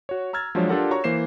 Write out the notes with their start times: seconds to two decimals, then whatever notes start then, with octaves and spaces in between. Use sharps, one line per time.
0.09 F#4 C#5
0.33 A#5 E6 F6 G#6 A6
0.55 F3 F#3 G#3 D4 C5 C#5
0.69 D4 F4 G4 A4 A#4 F#5
0.91 F#4 C#5 A#5 C#6
1.04 E3 A#3 C5 C7 E7